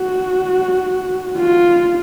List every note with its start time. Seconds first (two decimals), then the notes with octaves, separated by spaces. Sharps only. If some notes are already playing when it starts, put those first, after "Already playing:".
Already playing: F#4
1.38 F4